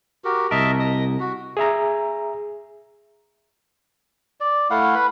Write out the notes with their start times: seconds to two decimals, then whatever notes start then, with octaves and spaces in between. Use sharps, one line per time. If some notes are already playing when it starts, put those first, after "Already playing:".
0.24 F#4 G4 A#4
0.51 C2 A#4 D#5 E5 A5
0.80 D#5 D#6
1.20 F#4
1.57 G#4 E5 A#5
4.40 D5
4.70 A3 E4 F5 F#5
4.95 B4 B5